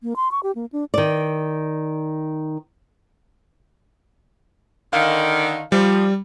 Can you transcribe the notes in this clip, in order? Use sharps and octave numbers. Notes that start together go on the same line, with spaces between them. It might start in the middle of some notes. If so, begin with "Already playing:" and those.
A#3
C6
C#6
G4
A#3
D4
D#3 D5
D3 D#3 F5
F3 G3